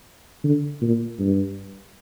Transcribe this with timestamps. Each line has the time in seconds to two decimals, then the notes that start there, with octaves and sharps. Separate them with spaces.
0.44 D3
0.82 A#2
1.19 G2